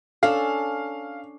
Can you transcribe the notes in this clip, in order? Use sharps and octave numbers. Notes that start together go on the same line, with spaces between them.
C#4 D4 A4 F5